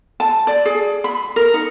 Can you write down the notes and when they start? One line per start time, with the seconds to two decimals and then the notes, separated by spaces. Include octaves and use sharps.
0.20 A5
0.47 D5
0.65 G#4
1.04 B5
1.36 A#4
1.54 D#4